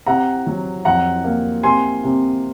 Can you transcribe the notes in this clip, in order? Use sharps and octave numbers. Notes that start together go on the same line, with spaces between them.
C3 F#5 A#5
F#3
F2 F#5 A#5
A#3
C3 G#5 C6
C3